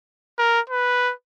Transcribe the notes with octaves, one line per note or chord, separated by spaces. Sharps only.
A#4
B4